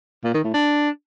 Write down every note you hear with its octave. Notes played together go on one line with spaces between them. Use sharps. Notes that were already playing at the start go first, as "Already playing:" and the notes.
A#2
D#3
A2
D4